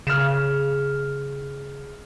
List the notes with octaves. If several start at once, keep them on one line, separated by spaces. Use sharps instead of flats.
C#3 F6 E7